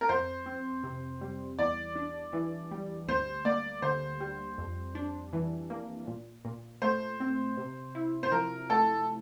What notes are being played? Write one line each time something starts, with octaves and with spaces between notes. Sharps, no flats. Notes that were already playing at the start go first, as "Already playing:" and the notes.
A#4
F2 C5
C4
C3
G3
E2 D5
D4
E3
G3
D2 C5
A#3 D5
D3 C5
G3
F2
D4
E3
A#3
A#2
A#2
A3 C5
C4
C3
E4
C5
F3 A#4
A3 A4